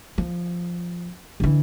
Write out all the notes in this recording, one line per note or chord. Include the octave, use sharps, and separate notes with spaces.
F3
D3 E3